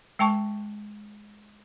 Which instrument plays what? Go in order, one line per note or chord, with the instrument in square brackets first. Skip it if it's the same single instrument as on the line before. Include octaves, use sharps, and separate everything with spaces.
[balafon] G#3 G5 A5 C#6